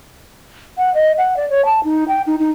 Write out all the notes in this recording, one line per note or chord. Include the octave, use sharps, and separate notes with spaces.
F#5
D#5
F#5
D5
C#5
A5
D#4
G5
D#4
D#4